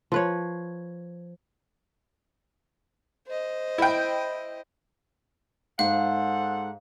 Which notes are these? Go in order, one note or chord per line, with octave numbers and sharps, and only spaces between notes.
F3 B4 C#5
C5 D#5
E4 G5
G#2 A4 C5 F5 F#5